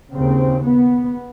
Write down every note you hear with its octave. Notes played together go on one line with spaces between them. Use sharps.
D#2 C#3 C4
B3